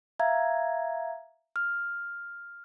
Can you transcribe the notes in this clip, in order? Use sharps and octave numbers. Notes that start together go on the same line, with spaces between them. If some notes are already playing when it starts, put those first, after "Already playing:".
E5 F5 A#5 G#6
F6